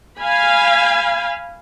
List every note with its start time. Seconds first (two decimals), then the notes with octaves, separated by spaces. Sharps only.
0.18 F5 G#5 B5